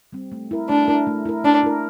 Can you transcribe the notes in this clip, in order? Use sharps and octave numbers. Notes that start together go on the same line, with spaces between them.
G3 C4
A3
E4 A#4
A3 D4
E4 A#4
A3
E4 A#4
A3 D4
E4 A#4